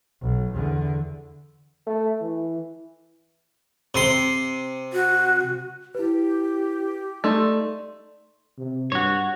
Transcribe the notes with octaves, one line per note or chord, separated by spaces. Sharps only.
B1
E2 D3
A3
E3
C3 C6
F#4
E4 G4 B4
A3 D#4 D5 C6
C3
G2 F#4 C#5